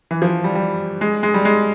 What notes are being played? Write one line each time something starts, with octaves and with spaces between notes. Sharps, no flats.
E3
F3
G3
G3
G#3
G#3
G3
G#3